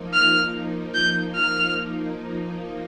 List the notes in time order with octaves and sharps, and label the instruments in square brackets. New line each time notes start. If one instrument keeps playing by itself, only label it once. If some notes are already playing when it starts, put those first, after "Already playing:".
Already playing: [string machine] F3 A#3 D#4
[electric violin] F6
G6
F6